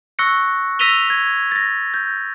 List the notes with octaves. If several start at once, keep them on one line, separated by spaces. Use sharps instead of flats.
C#6 E6 F#6 A#6 C#7
E6 A#6 B6 D#7 F7 G7
G#6
A6 A#6
G6